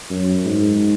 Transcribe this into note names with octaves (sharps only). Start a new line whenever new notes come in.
F#2
G#2